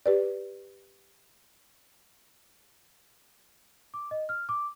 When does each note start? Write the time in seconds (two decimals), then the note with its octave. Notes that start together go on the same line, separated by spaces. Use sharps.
0.06 G4 B4 D5
3.94 D6
4.11 D#5
4.29 F6
4.49 D6